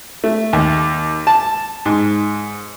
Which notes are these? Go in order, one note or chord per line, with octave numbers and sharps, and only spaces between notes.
A3
D#2
A5
G#2